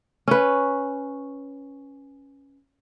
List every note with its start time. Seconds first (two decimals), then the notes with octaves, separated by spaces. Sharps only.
0.28 C#4 B4